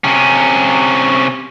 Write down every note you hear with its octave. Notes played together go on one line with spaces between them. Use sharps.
C3 C#4